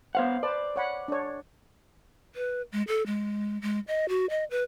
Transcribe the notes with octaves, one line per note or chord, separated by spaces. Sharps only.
B3 C5 C#5 F5 F#5
B4 C5 D5 A5
C#5 F#5 B5
D4 C#5
B4
G#3
A4
G#3
G#3
D#5
F#4
D#5
B4